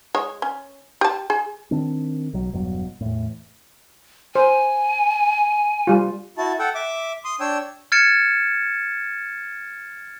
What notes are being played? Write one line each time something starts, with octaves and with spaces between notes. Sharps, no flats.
G#3 C#5
C#4
G4 A5
G#4
D#3 C4 D4
B1 F#3
E1 G2 B2 F#3
E2 A2
C5 G#5
G3 F4
E4 F#4 A5
A4 F#5 G5
E5 D6
C6 D#6
D4 C#5 G5 E6
F6 G#6 A6 C#7 D7 E7